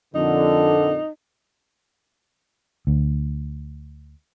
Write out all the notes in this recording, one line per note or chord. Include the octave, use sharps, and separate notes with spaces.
F2 A#2 D3 D#4
D2